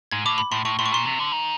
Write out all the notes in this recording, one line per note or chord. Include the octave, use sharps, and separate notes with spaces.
G#2 G#6
A2 D6
B5
A2 C6
A2 C#6
A2 C6
C#6
A#2 C6
C3
D3
D#3